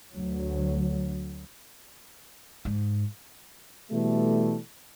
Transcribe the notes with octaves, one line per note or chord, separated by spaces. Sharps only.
D2 F#3
G#2
B2 E3 G3 A3